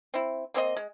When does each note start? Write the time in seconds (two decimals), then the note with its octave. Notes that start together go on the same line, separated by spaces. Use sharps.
0.14 C4 E4
0.54 A#3 C4 G#4 D#5
0.76 G#3